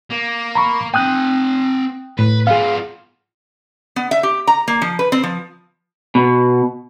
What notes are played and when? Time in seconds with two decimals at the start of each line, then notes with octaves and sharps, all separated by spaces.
0.10 A#3
0.55 A#5 B5 C#6
0.94 C4 G5 G#5 D#6 F#6
2.19 A2 B4
2.47 B3 F4 G#4 F5
3.96 B3
4.11 E5
4.23 G4
4.47 A#5
4.68 A#3
4.82 F3
4.99 B4
5.12 C4
5.23 F3
6.15 B2